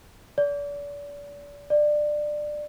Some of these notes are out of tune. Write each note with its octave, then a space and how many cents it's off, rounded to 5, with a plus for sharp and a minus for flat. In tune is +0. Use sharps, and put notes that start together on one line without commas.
D5 -35
D5 +20